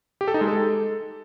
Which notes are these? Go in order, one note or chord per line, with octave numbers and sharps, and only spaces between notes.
G4
A4
D#4
G#3
A4